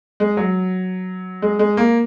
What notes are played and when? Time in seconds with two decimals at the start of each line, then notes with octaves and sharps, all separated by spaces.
0.20 G#3
0.37 F#3
1.42 G#3
1.59 G#3
1.77 A#3